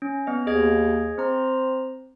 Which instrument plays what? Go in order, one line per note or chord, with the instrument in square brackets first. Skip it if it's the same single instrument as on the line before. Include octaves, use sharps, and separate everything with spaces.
[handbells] C#4
B3 D#5
[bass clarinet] D#2 [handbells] G#4 D#5 G#6
[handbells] C4 A#5 [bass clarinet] C5